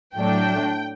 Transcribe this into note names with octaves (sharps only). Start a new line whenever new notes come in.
A2 F#3 A3 D4 G5